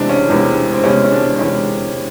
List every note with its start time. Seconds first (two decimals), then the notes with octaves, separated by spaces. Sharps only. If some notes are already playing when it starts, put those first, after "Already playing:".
Already playing: E1 E2 C3 E3 G#3 C4 D4
0.09 C#4
0.28 E1 E2 C3 E3 G#3
0.73 C4
0.84 E1 E2 C3 E3 G#3 C#4
1.04 C#4
1.12 D4
1.34 C4
1.39 E1 E2 C3 E3 G#3 C#4